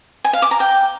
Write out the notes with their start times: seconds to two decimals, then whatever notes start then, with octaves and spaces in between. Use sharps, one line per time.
0.24 G#5
0.33 F5
0.42 D6
0.51 A#5
0.60 G5